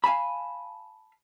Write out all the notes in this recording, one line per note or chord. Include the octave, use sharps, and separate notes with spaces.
F5 G#5 A5 B5